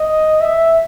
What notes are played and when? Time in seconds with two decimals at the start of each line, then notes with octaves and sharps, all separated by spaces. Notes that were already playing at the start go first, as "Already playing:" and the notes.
Already playing: D#5
0.41 E5